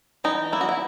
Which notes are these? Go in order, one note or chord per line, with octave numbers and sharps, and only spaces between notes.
E3 D#4
A#3 E4
F#4
E4